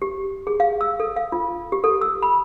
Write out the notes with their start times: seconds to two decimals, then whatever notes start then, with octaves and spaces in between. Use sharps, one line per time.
0.02 G4
0.47 G#4
0.60 F5
0.81 E6
1.00 A4
1.16 F5
1.32 F4
1.72 G4
1.84 A4
2.01 E6
2.23 B5